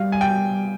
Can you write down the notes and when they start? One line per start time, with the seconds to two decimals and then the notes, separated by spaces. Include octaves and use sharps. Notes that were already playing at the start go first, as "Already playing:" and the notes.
Already playing: G3 F5
0.12 G#5
0.21 G5